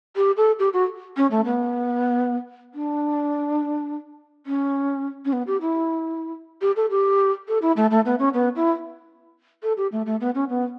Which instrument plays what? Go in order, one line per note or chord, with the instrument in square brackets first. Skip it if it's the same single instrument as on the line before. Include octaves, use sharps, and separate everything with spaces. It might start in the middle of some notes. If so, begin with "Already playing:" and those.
[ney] G4
A4
G4
F#4
C#4
A3
B3
D4
C#4
C#4
B3
G4
E4
G4
A4
G4
A4
E4
A3
A3
B3
C#4
B3
E4
A4
G4
A3
A3
B3
C#4
B3